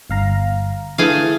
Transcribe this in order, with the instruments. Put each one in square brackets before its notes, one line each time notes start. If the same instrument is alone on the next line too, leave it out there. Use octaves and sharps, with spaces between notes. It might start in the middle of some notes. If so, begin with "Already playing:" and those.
[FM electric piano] G1 F5 A#5
[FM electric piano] D3 E3 [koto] A3 G#4 F5